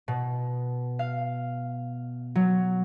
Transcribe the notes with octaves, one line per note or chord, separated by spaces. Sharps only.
B2
F5
F#3